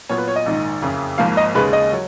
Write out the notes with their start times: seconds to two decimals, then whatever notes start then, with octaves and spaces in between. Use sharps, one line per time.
0.09 A#2 F#3 B3 F4 C#5
0.18 B4
0.28 C#5
0.36 D#5
0.46 A#1 G#2 D#3
0.82 F#1 F2 C#3
1.18 G#1 G#2 F3 A#3 F5
1.37 D#5
1.54 D#2 C#3 G#3 B4
1.73 D#5
1.93 F#3